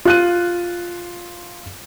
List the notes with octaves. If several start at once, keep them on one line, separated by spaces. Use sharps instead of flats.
F4 F#6 D#7